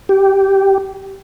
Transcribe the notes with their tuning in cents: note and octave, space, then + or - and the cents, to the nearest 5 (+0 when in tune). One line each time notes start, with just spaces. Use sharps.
G4 -10